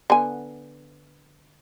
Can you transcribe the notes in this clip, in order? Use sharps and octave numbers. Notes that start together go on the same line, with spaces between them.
D3 B3 G#5